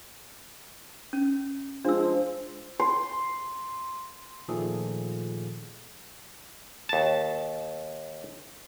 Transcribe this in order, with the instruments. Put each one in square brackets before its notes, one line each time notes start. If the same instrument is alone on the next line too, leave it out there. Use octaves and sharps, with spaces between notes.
[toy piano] C#4
[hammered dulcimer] F3 G#3 [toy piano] D4 E6
[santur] C6
[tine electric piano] A#2 D#3 F3 A3 G#4 A4
[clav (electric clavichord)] D#2 A5